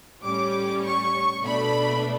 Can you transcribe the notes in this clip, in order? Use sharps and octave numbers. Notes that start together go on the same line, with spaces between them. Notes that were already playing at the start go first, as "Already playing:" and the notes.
A2 G3 C#4 D6
C#6
B2 A3 D4 B5